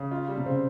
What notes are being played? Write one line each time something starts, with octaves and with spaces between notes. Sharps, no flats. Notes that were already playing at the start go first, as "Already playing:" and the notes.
Already playing: C#3
F4
G3
C3
C#3 C4